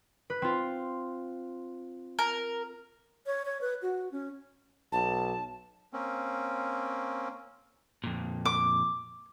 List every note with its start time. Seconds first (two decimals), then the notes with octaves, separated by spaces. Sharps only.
0.30 B4
0.42 C4 F4
2.19 A#4
3.26 C#5
3.45 C#5
3.61 B4
3.82 F#4
4.12 C#4
4.92 B1 A5
5.93 A#3 C4 C#4
8.04 F2 A#2
8.45 D6